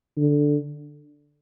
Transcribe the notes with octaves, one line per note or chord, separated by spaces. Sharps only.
D3